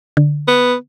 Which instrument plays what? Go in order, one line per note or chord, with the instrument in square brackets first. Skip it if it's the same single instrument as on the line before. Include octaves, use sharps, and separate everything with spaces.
[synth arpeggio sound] D3
[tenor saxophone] B3